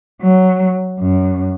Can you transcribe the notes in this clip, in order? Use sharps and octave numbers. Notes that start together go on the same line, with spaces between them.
F#3
F#2